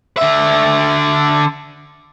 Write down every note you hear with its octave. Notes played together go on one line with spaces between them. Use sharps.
D3 E5